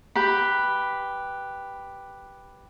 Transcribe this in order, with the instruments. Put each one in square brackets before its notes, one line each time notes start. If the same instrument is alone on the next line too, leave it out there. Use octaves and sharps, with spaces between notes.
[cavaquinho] G4 B4 B5